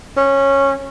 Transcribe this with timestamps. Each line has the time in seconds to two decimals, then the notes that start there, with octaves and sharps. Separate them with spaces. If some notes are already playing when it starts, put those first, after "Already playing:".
0.17 C#4